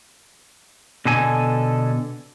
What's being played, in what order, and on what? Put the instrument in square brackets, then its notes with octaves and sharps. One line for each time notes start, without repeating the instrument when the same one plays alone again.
[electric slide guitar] B2 D3 A4 G#5